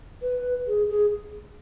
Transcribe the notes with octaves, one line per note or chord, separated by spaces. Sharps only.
B4
G#4
G#4